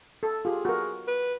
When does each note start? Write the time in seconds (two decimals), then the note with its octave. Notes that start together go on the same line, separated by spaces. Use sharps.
0.23 A4
0.45 F4 G4 G#4
0.65 F#4 A#4
1.08 B4